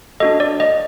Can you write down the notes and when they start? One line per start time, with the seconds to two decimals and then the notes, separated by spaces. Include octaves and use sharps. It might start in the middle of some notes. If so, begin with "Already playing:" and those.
0.20 D4 F#4 A4 D#5
0.40 D5
0.60 D#5